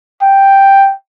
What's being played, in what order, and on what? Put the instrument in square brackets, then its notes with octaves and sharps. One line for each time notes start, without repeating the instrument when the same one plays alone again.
[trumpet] G5